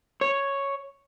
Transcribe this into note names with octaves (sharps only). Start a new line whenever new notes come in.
C#5